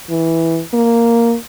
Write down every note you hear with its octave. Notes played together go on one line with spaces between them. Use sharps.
E3
A#3